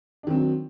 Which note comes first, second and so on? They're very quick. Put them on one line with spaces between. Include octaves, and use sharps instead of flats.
D4 D#3 C4 F#3